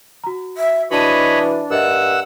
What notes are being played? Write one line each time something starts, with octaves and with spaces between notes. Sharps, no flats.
F#4 A#5
E5
E3 D4 F#4 C#5 D#5 A5 B5 D#7
G2 A#4 D#5 E5 F#5 E6